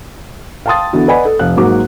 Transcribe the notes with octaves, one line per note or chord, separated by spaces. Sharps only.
F5 G5 A5 C6 D#6 A6
D3 E3 B3 F#4
B4 D5 D#5 F#5 G#5 B5
A4
F1 F5 F#6
G#2 F#3 A#3 F#4 D6